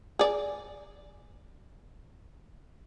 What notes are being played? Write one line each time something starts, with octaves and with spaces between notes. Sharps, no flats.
G#4 D5